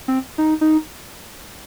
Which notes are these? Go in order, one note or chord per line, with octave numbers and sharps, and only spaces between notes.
C4
D#4
D#4